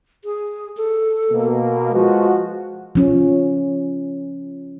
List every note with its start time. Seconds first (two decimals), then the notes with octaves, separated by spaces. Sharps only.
0.25 G#4
0.77 A4
1.31 B2 A#3
1.92 F3 G#3 F#4 B4
2.95 F3 C#4